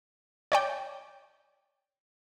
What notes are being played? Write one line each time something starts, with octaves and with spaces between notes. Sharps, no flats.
C#5 D5 G5